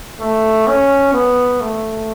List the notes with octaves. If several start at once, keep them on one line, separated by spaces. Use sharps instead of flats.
A3
C#4
B3
A3